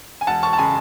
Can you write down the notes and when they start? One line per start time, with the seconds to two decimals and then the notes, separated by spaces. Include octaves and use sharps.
0.21 G#5
0.27 E1 F#5 A5
0.43 A5 C#6
0.53 A5
0.58 C#3 G#3 G#5 B5